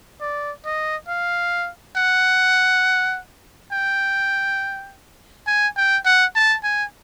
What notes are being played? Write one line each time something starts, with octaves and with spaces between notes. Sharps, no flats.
D5
D#5
F5
F#5
G5
G#5
G5
F#5
A5
G#5